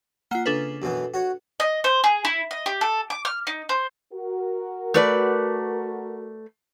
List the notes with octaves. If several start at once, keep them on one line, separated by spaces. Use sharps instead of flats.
A#3 F4 F#5
C#3 D4 A4 B4
F#2 B2 E3
F#4 C#5
D#5
C5
G#4
E4
D#5
G4
A4
D6
F6
D#4
C5
F#4 A#4
A3 B4 D5